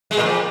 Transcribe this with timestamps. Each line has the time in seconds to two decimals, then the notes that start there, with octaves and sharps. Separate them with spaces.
0.11 G#3
0.17 A#2
0.23 F2